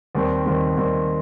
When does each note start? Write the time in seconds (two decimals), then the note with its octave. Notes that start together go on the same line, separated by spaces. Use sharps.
0.15 D#2 D#3 G3 C4
0.46 D#2 D#3 G3 C4
0.77 D#2 D#3 G3 C4